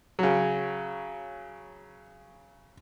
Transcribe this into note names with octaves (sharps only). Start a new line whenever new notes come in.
C#3 F#3